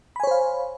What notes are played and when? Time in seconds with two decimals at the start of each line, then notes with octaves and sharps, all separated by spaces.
0.16 B5
0.20 G#5
0.23 C#5
0.27 C5
0.31 F5